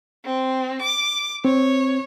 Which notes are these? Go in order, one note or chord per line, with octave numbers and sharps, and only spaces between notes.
C4
D6
C4 C#5